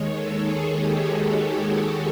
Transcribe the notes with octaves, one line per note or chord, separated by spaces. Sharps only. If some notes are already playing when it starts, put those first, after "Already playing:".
Already playing: D#2 D#3 G#3 C#5
A4
G#4
G4
F#4
F#4
G4